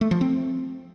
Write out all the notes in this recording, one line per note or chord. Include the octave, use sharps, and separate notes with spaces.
A3
F3
C4